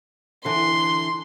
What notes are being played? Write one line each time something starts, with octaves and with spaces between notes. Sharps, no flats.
D3 E3 C6